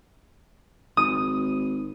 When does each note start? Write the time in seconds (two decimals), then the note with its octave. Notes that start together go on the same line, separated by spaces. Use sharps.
0.97 G#1 D#6